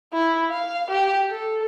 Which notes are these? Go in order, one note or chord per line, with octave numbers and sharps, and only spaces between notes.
E4
F5
G4
A4